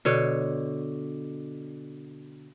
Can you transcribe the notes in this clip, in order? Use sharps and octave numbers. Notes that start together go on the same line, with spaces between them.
B2 D3 C#5